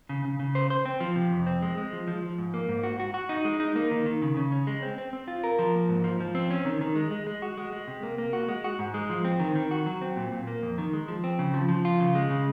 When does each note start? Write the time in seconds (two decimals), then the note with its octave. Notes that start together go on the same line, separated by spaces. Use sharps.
0.09 C#3
0.25 C#3
0.39 C#3
0.55 C5
0.70 C5
0.85 C4
1.00 F3
1.16 C3
1.32 F2
1.47 C4
1.62 G#3
1.78 G#3
1.93 F3
2.07 F3
2.22 F3
2.38 G#2
2.54 A#3
2.69 G#2
2.83 F#4
3.00 F#4
3.14 F#4
3.29 D#4
3.45 G#3
3.60 D#4
3.75 A#3
3.91 D#3
4.06 D#3
4.22 C#3
4.37 C#3
4.52 C#4
4.67 G#3
4.82 C4
4.98 C4
5.13 C4
5.28 F4
5.44 A#4
5.59 F3
5.75 A#3
5.89 G#2
6.04 F3
6.20 F3
6.35 C4
6.51 C#4
6.65 D#3
6.81 D#3
6.95 G#3
7.11 G#3
7.27 G#3
7.42 F#4
7.57 G#3
7.73 G#3
7.88 C3
8.03 A#3
8.18 A#3
8.33 F#4
8.48 G#3
8.64 F#4
8.79 G#2
8.94 G#3
9.10 F3
9.25 C4
9.40 D#3
9.55 D#3
9.71 F#4
9.86 F#3
10.02 C4
10.17 A#2
10.32 A#2
10.47 A#3
10.62 F2
10.78 D#3
10.93 G#3
11.08 F3
11.24 C4
11.39 C#3
11.54 F3
11.69 F3
11.85 F4
12.00 C#3
12.15 G#3
12.30 C#3